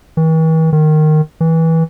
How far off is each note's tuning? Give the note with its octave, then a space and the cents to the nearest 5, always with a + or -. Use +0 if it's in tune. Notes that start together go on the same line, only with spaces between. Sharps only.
E3 -45
D#3 -15
E3 -20